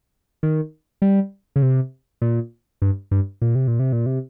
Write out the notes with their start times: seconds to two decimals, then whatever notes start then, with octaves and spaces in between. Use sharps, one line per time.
0.43 D#3
1.02 G3
1.56 C#3
1.62 C3
2.22 A#2
2.82 G2
3.11 G2
3.42 A#2
3.55 C3
3.68 A#2
3.79 C3
3.93 A#2
4.06 C3